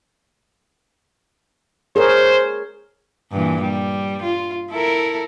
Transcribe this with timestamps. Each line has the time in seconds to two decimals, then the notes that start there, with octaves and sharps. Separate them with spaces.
1.96 G#4 A#4 C5 C#5
3.32 G2 A#2 E3
3.62 G3
4.22 F4
4.71 E4 A4 A#4